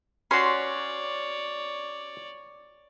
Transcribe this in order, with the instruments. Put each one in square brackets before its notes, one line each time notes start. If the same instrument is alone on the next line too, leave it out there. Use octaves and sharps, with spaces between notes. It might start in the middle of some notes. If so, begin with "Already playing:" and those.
[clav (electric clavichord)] C#4 F#4 [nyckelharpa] C#5 D5 [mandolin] C6